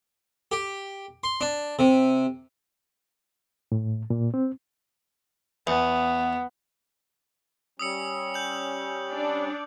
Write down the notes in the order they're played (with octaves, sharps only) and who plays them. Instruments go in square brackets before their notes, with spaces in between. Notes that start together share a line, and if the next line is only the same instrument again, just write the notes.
[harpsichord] G4
C6
D4
C3
[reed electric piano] A2
A#2
C4
[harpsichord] E2 [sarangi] B3
[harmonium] G3 C#4 [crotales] D#6 E6 C#7
[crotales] G6 F#7
[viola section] D4 D5